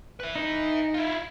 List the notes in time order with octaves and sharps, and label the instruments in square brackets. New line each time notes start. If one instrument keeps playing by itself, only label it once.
[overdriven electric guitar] B4 E5
[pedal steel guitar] D#4
[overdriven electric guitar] E4 F4